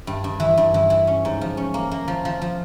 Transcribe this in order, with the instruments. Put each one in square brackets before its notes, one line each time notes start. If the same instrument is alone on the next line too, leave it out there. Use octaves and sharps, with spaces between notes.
[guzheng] G2
G2
E3
G2
E3
E3
C#4
G#2
F3
C#4
A#3
A#3
F3
F3
F3